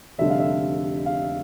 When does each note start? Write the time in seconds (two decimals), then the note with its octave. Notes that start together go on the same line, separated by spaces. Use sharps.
0.18 F1 F2 D3 G3 E5
0.30 F5
0.40 E5
1.06 F5